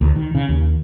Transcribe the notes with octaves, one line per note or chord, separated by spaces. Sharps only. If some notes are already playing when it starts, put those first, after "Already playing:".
D2
D#3
C#3
D#2